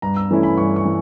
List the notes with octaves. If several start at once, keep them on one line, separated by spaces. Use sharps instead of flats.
G2 A#5
E6
E3 A3 C#4 E4
B5
G2 C#6
C#6
E3